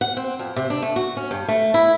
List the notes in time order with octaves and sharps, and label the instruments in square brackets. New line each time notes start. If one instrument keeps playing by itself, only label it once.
[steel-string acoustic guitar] F#5
C4
F2
C3
D4
A3
F#4
C#4
G2
A3
E4